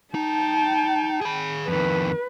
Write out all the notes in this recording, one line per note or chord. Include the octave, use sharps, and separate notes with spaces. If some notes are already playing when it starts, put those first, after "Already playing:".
D#4 G5 A5
G#4 B5
F2 D#3 B4